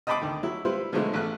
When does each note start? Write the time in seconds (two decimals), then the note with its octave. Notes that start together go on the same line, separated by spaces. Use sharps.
0.07 D#5 G5 A5 B5 C6 D6
0.21 D2 D#3
0.43 F#3 E4
0.65 G3 E4 F4 B4 C5
0.93 B2 D3 F3 F#3 G#3 A3
1.14 A1 A3 F#6